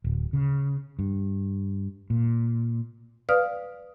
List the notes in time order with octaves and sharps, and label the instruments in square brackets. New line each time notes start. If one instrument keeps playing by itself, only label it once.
[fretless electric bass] D1
C#3
G2
A#2
[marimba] B4 D5 F5 D#6 F6